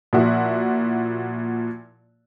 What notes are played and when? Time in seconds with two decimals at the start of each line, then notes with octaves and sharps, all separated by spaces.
0.13 A#2 F3 E4 F#4